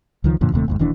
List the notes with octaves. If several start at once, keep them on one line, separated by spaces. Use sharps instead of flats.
C#2 D#3 F3
F#2 A#2 D3 F3
D#1 D#2 C3 A3
G#1 D#2 G#2
D#1 D#2 E3 D4